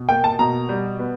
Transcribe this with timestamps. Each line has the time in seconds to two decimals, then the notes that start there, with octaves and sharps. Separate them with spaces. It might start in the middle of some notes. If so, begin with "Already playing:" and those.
Already playing: B2
0.09 A#3 G5
0.24 A5
0.39 B2 A#5
0.69 G3
0.99 B3